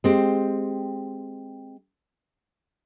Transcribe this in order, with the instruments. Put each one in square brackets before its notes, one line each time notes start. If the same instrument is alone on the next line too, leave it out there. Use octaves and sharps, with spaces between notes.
[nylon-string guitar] G#3 C4 G4